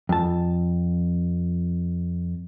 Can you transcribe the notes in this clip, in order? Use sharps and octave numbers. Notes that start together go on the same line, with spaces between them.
F2 A5